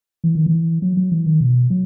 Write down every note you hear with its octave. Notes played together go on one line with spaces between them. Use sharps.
E3
D#3
E3
F#3
F#3
E3
D#3
B2
F#3